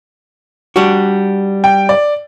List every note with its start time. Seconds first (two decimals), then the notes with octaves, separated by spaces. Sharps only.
0.76 G3 D4 F#4
1.64 G5
1.89 D5